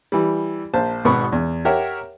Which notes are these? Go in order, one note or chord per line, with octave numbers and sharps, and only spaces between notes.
E3 G3
A#1 C5 A5
G#1 B2 B3 B5 C#6
E2
G4 A#4 C#5 E5 F#5